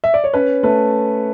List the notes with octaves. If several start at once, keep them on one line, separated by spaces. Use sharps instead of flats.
E5
D5
C#5
C#4 B4
A3 B4